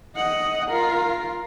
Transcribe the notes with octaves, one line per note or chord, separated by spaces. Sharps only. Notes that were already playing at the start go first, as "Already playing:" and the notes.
D#5 F#5
F4 A#4